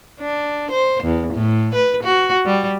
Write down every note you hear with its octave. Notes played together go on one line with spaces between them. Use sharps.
D4
C5
E2
A2
B4
F#4
G3